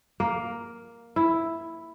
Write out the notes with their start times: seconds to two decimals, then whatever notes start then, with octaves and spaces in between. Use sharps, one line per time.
0.20 A#3
1.16 E4